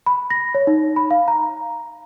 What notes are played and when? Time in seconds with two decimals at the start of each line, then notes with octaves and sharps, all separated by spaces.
0.06 B5
0.30 A#6
0.55 C#5
0.67 D#4
0.96 B5
1.11 F5
1.28 A#5